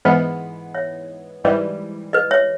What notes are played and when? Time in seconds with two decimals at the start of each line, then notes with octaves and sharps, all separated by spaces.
0.05 G#2 E3 G#3 B3 B4 D#5
0.75 C#5 E5
1.44 G#2 E3 G3
2.13 B4 D#5
2.31 C#5 E5